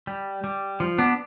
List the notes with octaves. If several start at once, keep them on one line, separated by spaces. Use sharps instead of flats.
G3
G3
F3
B3 D4